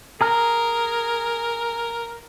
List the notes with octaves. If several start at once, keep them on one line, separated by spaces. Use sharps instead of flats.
G#4 A#4 A#5 F6